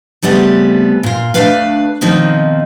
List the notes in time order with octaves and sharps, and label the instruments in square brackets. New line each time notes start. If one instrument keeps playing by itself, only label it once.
[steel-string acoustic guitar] C#3 G3 A3 B3 C4
A#2 F4
D2 F3 A3 D4 B4 F5
B2 D#3 F3 C4 D#4